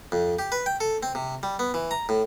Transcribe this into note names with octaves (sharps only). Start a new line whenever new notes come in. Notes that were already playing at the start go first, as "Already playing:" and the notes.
F2
G4
B4
G5
A4
C4
C3
G3
B3
E3
A#5
A2